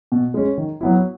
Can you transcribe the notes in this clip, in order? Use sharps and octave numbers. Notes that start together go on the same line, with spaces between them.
B2
G#3 C#4
D#3
F#3 B3 E4